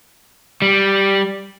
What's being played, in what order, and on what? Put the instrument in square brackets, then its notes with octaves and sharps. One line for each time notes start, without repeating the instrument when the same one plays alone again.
[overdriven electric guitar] G3